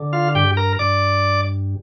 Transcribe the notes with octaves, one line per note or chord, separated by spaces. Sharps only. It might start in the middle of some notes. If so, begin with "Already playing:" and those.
Already playing: D3
F4 F5
G2 G4 G5
A#4 A#5
G2 D5 D6